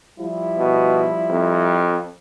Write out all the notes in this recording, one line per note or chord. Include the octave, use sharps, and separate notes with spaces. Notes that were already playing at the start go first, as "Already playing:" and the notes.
F3 G3 E4
B2
F2